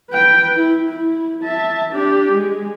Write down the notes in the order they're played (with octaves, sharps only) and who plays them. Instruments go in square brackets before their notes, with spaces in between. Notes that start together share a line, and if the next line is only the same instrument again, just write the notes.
[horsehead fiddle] B4 G5
E4
E4
E5 A5
D4 G4
G#3